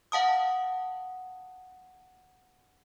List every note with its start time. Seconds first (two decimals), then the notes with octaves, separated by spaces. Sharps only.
0.12 F5 F#5 A5 D#6